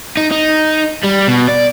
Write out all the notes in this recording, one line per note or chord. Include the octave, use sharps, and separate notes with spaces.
D#4
D#4
G3
B2
D5